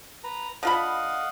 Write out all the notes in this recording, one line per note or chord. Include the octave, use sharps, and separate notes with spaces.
B4 A#5
D3 F4 D#5 F5 F#5 B5